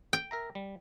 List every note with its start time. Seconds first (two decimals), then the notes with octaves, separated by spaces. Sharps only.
0.13 G5
0.31 A#4 E5 A#5
0.55 G3